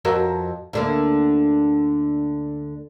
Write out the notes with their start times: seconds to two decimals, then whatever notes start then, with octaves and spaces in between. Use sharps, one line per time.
0.05 F2 F#4 A#4
0.73 D2 D3 A#3